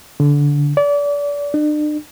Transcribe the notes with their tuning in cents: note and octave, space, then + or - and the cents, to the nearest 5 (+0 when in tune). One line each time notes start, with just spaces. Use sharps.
D3 -20
D5 -30
D4 +40